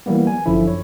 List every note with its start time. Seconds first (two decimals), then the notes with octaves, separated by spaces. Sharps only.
0.06 E3 F#3 G3 A#3 B3
0.27 G#5
0.46 G1 F#2 D3 F3 E4
0.67 C#5